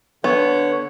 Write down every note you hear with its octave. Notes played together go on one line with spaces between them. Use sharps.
D3 B3 C#5